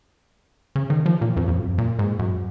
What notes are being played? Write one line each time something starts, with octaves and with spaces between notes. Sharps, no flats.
C#3
D#3
F3
A#2
F2
F2
F#2
A#2
G#2
F#2